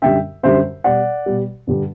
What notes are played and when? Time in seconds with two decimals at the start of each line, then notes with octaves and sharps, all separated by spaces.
0.02 F#2 D3 G3 E5 G5
0.43 F#2 D3 G3 C5 E5
0.84 B2 G3 D5 F#5
1.26 B2 G3
1.67 G2 D3 G3